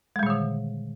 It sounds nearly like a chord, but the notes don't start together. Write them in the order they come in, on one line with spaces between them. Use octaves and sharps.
G#3 G3 A#2 D#3 D3